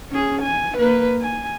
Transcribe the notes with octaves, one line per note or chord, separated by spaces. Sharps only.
C#4 G#4
G#5
A#3 B4
G#5